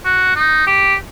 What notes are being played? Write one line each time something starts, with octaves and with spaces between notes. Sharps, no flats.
F#4
D#4
G4